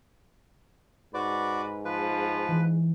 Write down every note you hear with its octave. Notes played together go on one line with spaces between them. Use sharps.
G#2 F#4 B4 D5
F3 B4
E3